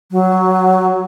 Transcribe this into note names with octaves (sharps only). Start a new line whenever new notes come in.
F#3